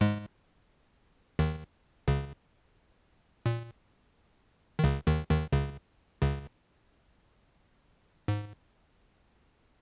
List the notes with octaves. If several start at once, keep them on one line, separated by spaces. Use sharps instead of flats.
G#2 G#3
D#2 D#3
C#2 C#3
A#2
D#3
C#2 C#3
D#2 D#3
D#2 D#3
C#2 C#3
C#2 C#3
G#2